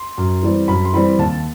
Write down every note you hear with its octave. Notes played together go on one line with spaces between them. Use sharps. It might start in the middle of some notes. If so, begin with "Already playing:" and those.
Already playing: C6
F#2
E3 G3 C4
F#2 B5
C6
E3 G3 C4 B5
D#2 A5